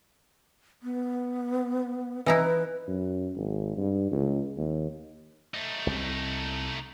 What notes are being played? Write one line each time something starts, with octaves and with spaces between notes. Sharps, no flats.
B3
E3 D#4 E4 B4
F#2
G#1
G2
C#2
D#2
A3 D#4
C2